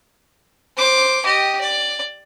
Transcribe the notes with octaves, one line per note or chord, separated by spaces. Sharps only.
C5 D6
G4 D#5
D5